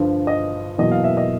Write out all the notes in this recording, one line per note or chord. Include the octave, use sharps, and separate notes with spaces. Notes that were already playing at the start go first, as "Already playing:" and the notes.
Already playing: G2 D3 F3
D#5
E2 B2 F#3 A#3 D#5
F5
E5
D#5